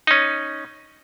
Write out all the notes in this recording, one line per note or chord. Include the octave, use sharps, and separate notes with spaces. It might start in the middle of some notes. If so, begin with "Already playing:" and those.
C#4 D#4